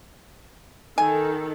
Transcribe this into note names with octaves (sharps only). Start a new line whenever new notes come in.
D#3 A4 G#5